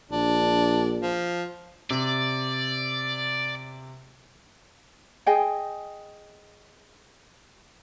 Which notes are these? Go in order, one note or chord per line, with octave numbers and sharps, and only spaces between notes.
A#1 D4
F3
C3 D5
G#4 D#5 G5 G#5